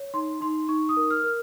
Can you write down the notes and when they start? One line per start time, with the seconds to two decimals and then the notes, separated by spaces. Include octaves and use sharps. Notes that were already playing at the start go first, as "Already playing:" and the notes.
Already playing: C#5
0.14 D#4 C6
0.41 D#4 C6
0.68 D#4 C#6
0.89 D#6
0.97 A#4
1.10 F6
1.24 A#4